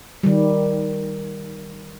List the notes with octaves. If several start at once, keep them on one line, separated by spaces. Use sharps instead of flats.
D#3 G3